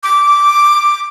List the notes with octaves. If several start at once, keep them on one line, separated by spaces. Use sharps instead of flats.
D6